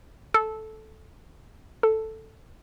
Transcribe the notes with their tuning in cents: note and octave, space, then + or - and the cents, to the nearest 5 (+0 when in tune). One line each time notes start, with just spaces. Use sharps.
A4 -10
A4 +5